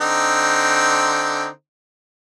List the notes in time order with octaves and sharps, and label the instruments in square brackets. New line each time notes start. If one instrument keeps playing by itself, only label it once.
[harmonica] D3 C4 D#4